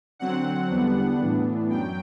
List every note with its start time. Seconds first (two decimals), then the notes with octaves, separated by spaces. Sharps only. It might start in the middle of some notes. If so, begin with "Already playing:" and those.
0.19 D3 F#3 C4 F#5
0.69 E2 D3 G3 B3 D4 F#5
1.19 A2 E3 B3 D4
1.70 F#2 F#3 G5